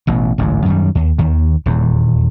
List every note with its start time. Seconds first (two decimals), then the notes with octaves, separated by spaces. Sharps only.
0.07 A1 B2
0.38 D1 A1 G#2
0.65 F#2 D#3 G3
0.95 D#2
1.18 D#2 D#3
1.66 D#1 E2